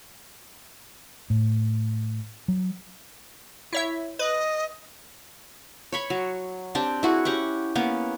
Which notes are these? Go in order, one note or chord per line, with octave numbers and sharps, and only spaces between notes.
A2
F#3
E4 C#5 E5
B4 D#5
C#5 B5 C#6
F#3
C4 D4 G4
E4 F#4 G#4
C#4 G4 F#5 C#6
A#3 B3 C#4